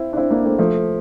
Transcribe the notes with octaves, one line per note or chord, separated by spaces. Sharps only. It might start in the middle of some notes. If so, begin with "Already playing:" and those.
Already playing: C4 E4
D4
C4 E4
A#3 D4
A3 C4
F3 A3